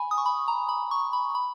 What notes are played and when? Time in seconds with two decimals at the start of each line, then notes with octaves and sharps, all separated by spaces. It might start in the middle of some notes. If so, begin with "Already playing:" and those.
Already playing: G#5 B5
0.11 D#6
0.18 C#6
0.26 B5
0.48 A#5
0.69 B5
0.91 C#6
1.13 B5
1.35 B5